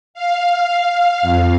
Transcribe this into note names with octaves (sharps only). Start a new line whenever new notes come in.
F5
F2